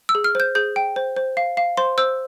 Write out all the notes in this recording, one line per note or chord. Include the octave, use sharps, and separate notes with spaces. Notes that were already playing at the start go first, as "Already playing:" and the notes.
E6
G#4
F6
C5 G6
G#4 G6
G5
C5
C5
F5
F5
C5 C6
C5 E6